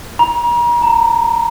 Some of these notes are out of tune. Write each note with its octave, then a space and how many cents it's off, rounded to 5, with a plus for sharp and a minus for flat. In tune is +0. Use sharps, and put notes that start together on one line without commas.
A#5 +40
A#5 -25